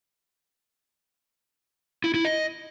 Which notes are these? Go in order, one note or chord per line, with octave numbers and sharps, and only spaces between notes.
E4
E4
D#5